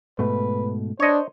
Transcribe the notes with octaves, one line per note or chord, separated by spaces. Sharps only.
G#2 B2 A3 B4
D4 C5 C#5 D#5